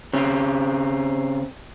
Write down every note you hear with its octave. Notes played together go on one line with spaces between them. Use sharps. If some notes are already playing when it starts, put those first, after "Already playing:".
C#3 C4